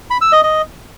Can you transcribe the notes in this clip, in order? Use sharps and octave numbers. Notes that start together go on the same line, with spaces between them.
B5
E6
D#5
D#5